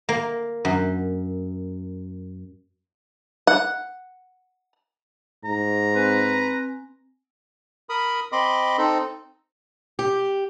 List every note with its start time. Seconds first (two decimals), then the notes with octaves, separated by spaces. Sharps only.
0.09 A#3
0.65 F#2
3.47 F#5
5.45 G#2 A#5
5.94 C4 B4 G#5
7.89 A#4 B5 D#6
8.32 C4 D#5 B5 C6 D6
8.78 C4 D#4 A4
9.99 G4